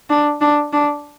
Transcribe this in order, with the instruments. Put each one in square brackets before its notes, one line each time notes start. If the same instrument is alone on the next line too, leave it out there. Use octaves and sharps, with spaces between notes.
[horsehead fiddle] D4
D4
D4